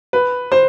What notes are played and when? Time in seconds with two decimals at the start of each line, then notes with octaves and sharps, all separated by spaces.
0.13 B4
0.52 C5